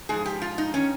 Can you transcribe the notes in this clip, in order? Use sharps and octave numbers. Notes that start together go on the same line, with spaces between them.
G#2 F3 G#4
G4
F4
D#4
D#3 C#4